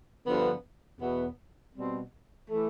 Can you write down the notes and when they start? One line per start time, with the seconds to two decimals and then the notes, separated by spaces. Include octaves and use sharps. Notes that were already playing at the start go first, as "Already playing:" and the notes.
0.26 G2 D3 F3 B3
1.00 E2 B2 B3
1.75 B2 G3 C4
2.49 E3 A3